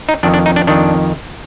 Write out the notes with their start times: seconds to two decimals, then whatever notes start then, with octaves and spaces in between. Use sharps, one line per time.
0.09 D#4
0.23 F2 D#3 D4
0.34 D4
0.46 D#4
0.56 D4
0.67 F2 D#3 D4